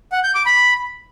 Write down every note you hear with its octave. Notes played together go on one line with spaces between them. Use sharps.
F#5
G6
D6
B5